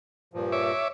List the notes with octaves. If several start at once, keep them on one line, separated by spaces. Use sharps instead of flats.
G2 A#2 F3
C#5 E5 D6